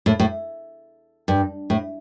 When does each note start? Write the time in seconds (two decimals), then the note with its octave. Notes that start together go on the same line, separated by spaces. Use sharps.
0.06 A2
0.20 A2
1.28 G2
1.70 A2